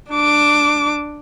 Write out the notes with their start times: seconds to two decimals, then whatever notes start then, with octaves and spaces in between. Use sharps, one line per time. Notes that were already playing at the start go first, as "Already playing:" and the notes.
0.12 D4 D6